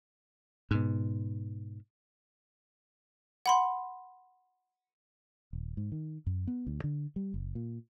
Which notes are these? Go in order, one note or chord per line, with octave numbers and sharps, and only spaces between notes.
G#2 B2
F#5 B5 C6
D#1
G#2
D#3
F#2
B3
D2
D3
G3
F#1
A#2